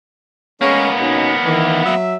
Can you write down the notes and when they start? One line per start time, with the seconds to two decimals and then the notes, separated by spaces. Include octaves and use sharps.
0.61 G#3 A#3 B3 C#4
0.99 B2 C#4 D#4
1.44 D#3 E3
1.85 F#3 E5